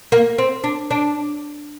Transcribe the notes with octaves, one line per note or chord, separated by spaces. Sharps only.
A#3
C4
D4
D4